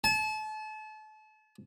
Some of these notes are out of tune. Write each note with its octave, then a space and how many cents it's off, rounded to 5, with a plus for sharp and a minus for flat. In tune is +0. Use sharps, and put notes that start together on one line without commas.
A5 -35